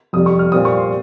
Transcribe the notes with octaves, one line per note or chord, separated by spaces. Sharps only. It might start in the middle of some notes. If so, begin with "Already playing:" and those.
F2 C3 G3 D#6
C#6
F6
A#2 G3 C4 D#6
C#6
C6